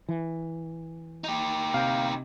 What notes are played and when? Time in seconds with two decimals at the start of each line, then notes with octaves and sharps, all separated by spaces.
0.09 E3
1.24 D#4 G4
1.74 C3 F5 G5